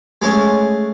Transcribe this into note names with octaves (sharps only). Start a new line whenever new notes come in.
G#3 A3 C#4